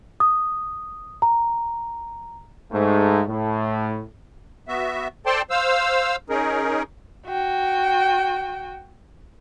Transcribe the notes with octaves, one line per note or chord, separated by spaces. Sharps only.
D#6
A#5
G#2 A3
A2
B3 F#4 E5
A4 C5 D5 G5 A5 C6
C5 F5 E6
C#4 D#4 G#4 A#4
F#4 G5